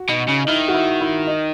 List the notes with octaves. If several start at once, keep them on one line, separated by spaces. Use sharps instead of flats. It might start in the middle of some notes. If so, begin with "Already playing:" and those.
Already playing: F#4
B2 D#4
C#3
D#4
D#3 E4
F#4
E4
E4
D#4